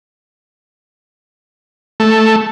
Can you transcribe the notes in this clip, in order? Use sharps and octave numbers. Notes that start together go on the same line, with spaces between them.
A3